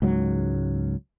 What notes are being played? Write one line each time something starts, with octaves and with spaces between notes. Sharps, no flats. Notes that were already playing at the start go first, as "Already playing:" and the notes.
C#2 G#2 F#3